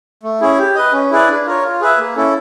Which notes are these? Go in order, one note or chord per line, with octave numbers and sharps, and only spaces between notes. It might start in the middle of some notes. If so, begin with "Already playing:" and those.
A3
C#4 E4 G#4
G4
B4 D#5
C#4
E4 G#4 B4 D5
D4
F4 A#4 C#5
F4
G#4 B4 E5
A#3
C#4 E4 A4